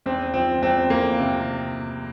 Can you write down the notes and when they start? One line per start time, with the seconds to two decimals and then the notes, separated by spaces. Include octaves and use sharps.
0.06 E2 C4
0.34 F3 C4
0.62 E2 C4
0.90 E2 A#3
1.20 C3